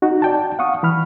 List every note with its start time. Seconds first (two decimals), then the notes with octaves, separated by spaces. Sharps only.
0.02 D#4 F#4
0.22 D5 G5 A5
0.59 F5 F#5 C#6 D#6
0.83 E3 B5 F6